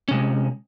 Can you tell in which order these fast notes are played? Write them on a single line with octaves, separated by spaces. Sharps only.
C#4 C3 G#3